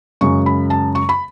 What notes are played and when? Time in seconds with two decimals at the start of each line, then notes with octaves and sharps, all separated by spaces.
0.21 F#2 C#3 G#3 C#6
0.46 B5
0.70 A5
0.95 C#6
1.09 B5